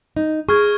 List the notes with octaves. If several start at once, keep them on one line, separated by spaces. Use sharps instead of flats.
D#4
G#4 C#6 F6 G#6